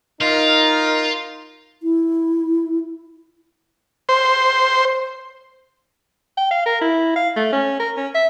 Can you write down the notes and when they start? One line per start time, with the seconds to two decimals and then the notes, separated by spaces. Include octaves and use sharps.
0.21 D#4 F4 A#4
1.83 E4
4.09 C5
6.38 G5
6.51 F5
6.66 A#4
6.81 E4
7.16 F5
7.36 A3
7.53 C#4
7.80 A#4
7.97 C#4
8.15 E5